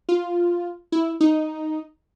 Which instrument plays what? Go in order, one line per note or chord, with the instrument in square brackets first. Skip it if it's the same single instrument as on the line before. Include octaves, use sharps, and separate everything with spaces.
[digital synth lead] F4
E4
D#4